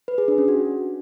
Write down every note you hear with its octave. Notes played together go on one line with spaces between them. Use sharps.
B4
G#4
D4
C#4
F#4